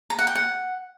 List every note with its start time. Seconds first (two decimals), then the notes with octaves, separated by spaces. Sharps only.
0.10 A#5
0.19 F#5
0.27 G5
0.35 F#5